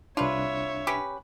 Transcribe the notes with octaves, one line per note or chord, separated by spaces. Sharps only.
C2 D4 F4 B4 C#5 E5
C#4 G4 B4